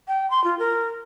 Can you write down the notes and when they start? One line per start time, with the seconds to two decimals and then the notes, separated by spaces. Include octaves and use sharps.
0.08 G5
0.31 C6
0.44 F4
0.59 A#4